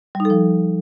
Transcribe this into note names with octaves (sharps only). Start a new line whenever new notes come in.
G3
D#4
A4
F3